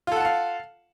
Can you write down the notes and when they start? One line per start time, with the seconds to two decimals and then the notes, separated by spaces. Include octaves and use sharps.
0.07 F4
0.12 A4
0.16 F#5
0.20 A5
0.25 F5